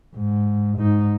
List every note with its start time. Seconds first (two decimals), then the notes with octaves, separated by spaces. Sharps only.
0.15 G#2
0.77 G#2 D#4